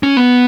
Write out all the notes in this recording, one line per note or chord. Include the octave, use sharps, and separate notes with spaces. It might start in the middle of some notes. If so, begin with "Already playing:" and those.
C#4
B3